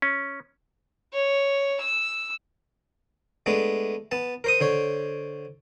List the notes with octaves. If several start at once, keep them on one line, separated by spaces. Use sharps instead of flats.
C#4
C#5
E6
G#3 A3 B3 D4
B3 A5
A#4 C5 D#6
D3 C5 C#5